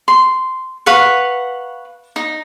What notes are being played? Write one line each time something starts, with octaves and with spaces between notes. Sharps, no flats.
C6
B4 F5 F#5 C#6
D#4